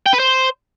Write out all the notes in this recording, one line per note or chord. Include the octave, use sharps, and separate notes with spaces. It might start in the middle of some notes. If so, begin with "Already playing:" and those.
G5
B4
C5